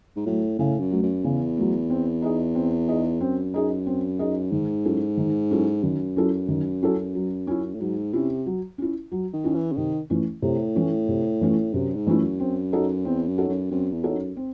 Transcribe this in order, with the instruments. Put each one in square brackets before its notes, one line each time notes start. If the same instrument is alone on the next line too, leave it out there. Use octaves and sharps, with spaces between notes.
[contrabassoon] G#2
[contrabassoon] A2 [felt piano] F#3 A3
[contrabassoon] A2 [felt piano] C#3
[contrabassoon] F#2
[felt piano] F#3 A3
[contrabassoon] F#2
[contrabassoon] E2 [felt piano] C#3
[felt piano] F#3 A3
C4
D#4 G#4 D#5
C4
D#4 G#4 D#5
[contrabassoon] F#2 [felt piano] C4
[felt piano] D#4 G#4 D#5
C4
D#4 G#4 D#5
[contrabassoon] G#2 [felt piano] D#3
[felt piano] F#3 C#4 E4 A4
D#3
F#3 C#4 E4 A4
[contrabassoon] F#2 [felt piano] D#3
[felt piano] F#3 C#4 E4 A4
D#3
F#3 C#4 E4 A4
F#3
C#4 E4
[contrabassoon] A2
[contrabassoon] G#2 [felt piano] F#3
[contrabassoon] C3 [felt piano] C#4 E4
[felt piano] F#3
C#4 E4
F#3
[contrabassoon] D#3
[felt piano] C#4 E4
[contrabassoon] E3
C#3
[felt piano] C3 [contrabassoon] D#3
[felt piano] E3 A3 C#4 E4
[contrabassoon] A2 [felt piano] C3
[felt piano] E3 A3 C#4 E4
C3
E3 A3 C#4 E4
[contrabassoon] F#2 [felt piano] C3
[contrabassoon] G#2
[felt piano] E3 A3 C#4 E4
[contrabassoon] F#2
[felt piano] C4
D#4 F#4 A4 C#5
[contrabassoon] E2 [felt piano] C4
[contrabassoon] F#2
[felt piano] D#4 F#4 A4 C#5
[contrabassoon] F#2
[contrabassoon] F#2 [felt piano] C4
[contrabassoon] E2
[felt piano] D#4 F#4 A4 C#5
[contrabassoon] F#2
[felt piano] C4